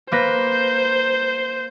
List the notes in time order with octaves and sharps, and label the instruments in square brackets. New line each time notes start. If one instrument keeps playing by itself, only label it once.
[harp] A#3 B4 A#6 [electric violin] C5